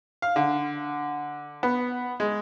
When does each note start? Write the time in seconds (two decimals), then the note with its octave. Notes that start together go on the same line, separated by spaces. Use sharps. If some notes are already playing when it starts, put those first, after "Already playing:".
0.22 F5
0.36 D3
1.63 B3
2.20 G#3